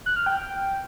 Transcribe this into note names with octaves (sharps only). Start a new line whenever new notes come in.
F#6
F6
G5